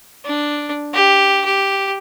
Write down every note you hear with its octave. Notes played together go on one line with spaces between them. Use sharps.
D4
G4
G4